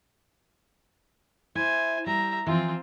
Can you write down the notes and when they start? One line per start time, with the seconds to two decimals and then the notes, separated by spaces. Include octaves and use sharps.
1.55 E4 C5 G#5
2.06 G3 E5 A#5
2.47 E3 F3 C4 F4